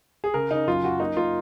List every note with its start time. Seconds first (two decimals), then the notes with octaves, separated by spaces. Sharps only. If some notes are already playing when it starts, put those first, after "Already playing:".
0.24 G#4
0.34 C#3 A#4
0.51 C#3 D#4
0.67 F#2 F4
0.83 F#2 F#4
1.00 A#3 D#4
1.17 A#3 F4